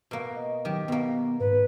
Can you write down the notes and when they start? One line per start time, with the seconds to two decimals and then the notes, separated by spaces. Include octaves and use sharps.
0.11 B2 A#3
0.35 D#5
0.65 D#3 F#3 G4
0.88 B2 A#3 B3
1.40 G#2 B4